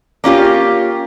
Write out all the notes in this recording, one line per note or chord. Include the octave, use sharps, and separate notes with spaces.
A#3 C#4 F4 G4